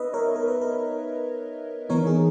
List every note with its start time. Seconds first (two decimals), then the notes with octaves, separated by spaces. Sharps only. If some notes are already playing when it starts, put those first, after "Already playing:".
Already playing: B3 D#4 B4 D#5 E5
0.13 A#4 C#5
0.36 A#4
0.48 B4
0.61 A#4
1.89 E3 B3 D#4 A#4 C#5
2.07 G#4